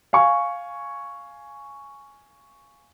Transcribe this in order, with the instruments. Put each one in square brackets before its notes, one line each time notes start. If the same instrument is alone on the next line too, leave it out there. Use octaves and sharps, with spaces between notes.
[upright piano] F5 G#5 C#6